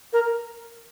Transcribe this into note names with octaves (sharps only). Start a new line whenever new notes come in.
A#4